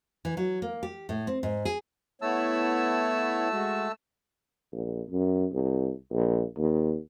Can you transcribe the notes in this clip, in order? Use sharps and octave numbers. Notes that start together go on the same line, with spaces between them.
E3
F#3
A#3
G4
A2
C4
G#2
G#4
A3 B3 E4 C#5 A5 E6
G#3 F#4
A#1
F#2
C2
A#1
D#2